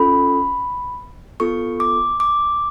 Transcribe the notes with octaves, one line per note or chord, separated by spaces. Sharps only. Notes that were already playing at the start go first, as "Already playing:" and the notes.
Already playing: C#4 F4 A4 B5
B3 F4 A4 C#6
D6
D6